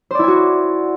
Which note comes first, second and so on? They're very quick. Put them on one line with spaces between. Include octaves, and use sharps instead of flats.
C5 D5 E4 G#5 F#4